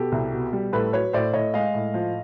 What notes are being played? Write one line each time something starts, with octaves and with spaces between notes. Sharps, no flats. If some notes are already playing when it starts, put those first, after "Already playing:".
Already playing: B2 G4 A4
C2
B2
G3
A2 A4 B4
F#3 B4 C#5
A2 C5 D5
A2 C#5 D#5
G#3 D#5 F5
A2
F3